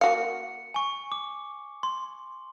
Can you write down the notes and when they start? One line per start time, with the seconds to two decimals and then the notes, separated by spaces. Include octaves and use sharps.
0.01 A#3 F#4 F5 C#7
0.74 G#5 C#6
1.12 D6
1.83 C6